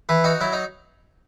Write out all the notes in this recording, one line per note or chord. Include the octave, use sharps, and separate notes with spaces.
E3 B4
D#4 F#4
F#3 E4
D#4